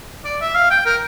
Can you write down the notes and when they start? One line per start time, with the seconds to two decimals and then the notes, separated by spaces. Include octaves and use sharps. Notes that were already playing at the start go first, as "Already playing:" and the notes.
0.25 D5
0.41 E5
0.55 F5
0.70 G5
0.86 A#4